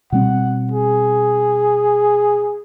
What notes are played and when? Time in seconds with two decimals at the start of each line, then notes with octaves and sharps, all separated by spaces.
0.12 B2 G3 C4 F#5
0.72 G#4